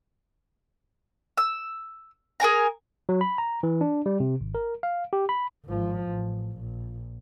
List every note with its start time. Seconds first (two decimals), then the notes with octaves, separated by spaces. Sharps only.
1.37 E6
2.40 G#4 A#4 G#5 A#5
3.09 F#3
3.21 B5
3.38 A#5
3.63 E3
3.81 D4
4.06 G3
4.20 C3
4.41 G#1
4.55 A#4
4.83 F5
5.13 G4
5.29 B5
5.66 G#1 F3
6.08 A1
6.58 A#1